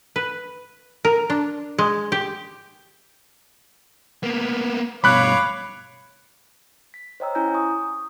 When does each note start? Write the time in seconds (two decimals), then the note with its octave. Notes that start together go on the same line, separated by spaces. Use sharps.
0.16 B4
1.05 A#4
1.30 D4
1.78 G#3
2.12 G4
4.23 A#3 B3
5.04 G2 B2 C#5 F5 B5 D6 F#6
6.94 B6
7.20 C5 C#5 D#5 G5 A#5 E6
7.35 C#4 E4 G#5 A#5 G6
7.54 C#6 D#6